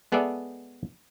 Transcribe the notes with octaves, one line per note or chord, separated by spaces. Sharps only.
G#3 B3 G#4 A4 D5 E5